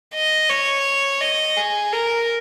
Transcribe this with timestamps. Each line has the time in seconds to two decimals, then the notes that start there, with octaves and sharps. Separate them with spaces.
0.14 D#5
0.50 C#5
1.21 D#5
1.57 G#4
1.93 A#4